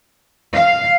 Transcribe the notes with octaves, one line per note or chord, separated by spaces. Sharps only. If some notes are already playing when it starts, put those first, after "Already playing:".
F5